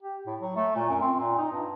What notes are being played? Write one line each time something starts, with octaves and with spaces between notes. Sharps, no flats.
G4
A2
F#3
A3
A#2
F#2
C4
A#2
D#4
G2